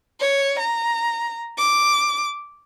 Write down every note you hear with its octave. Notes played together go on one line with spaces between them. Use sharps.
C#5
A#5
D6